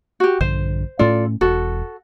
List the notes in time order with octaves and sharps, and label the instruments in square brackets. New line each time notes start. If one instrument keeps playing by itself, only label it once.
[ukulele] F#4 G4
[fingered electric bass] A#1 G2 D3 [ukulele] C5
[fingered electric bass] A2 A3 C#4 [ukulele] F4 A4 D5
[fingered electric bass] E1 [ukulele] F#4 A4